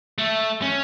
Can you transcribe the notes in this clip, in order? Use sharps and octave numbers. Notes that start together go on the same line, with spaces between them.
A3
C#4